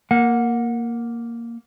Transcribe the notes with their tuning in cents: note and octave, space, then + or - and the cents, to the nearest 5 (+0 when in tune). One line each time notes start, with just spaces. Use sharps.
A#3 +0 F#5 -25